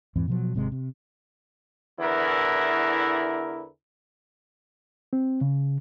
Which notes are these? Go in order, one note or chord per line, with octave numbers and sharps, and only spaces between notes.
E2 G#2 E3 C4
B2 F3 F#3
G#1 C3 G#3
C3
E2 D3 E3 E4 A#4
C4
C#3